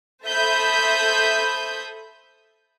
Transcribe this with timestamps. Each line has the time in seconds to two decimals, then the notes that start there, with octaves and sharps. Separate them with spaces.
0.25 A4 C5 E5 B5 D#6 G6